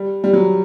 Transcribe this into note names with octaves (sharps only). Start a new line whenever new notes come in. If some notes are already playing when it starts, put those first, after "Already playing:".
Already playing: G3
G3
F#3